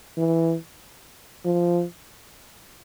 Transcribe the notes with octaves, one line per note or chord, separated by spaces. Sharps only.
E3
F3